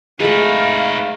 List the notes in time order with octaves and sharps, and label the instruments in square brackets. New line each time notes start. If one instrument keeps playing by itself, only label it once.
[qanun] G#3 A3 [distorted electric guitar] D#4 B4 [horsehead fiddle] F5